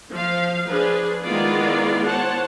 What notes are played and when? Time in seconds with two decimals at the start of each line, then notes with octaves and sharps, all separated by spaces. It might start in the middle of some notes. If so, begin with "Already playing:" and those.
0.11 F3 F5
0.68 F3 D4 G#4 B4
1.23 D#3 G#3 B3 E4 F4 D5
2.06 C5 C#5 F#5 A5